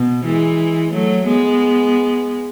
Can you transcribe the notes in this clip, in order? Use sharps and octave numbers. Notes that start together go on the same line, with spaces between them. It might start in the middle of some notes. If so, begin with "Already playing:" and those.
Already playing: B2
E3 G#3
F#3 A3
G#3 B3